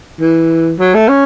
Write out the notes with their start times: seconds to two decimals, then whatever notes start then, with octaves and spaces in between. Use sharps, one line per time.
0.20 E3
0.79 F#3
0.94 A3
1.09 C#4